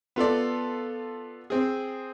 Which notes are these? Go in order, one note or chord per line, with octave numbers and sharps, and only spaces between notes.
B3 F4 A4 D5
C4 G#4